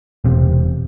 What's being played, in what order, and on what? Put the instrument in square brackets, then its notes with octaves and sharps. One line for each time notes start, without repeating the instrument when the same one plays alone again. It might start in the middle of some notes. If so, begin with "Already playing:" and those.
[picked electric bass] E1 C3